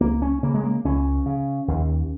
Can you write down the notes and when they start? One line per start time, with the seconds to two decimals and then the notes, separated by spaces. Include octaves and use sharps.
0.01 C#2 A#3
0.22 C#4
0.43 C#3 A#3
0.54 G#3
0.64 A#3
0.85 C#2 C#4
1.26 C#3
1.68 D#2